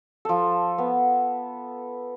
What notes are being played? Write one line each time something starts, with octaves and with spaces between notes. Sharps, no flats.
F3 A4
B3